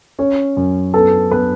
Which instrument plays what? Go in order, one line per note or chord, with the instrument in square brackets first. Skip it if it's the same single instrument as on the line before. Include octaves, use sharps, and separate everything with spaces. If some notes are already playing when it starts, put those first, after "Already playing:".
[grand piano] C#4 [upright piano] C#5
[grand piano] F#2
[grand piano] B3 [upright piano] A4
[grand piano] B3 [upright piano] B4